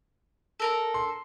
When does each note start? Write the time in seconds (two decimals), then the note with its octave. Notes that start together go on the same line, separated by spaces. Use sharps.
0.60 A4 A#4 A#5
0.94 C6